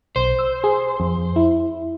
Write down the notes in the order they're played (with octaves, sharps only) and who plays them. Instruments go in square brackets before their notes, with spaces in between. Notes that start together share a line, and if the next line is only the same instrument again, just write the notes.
[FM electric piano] B1 [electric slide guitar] C5
[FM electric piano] E6
G#4
F2
E4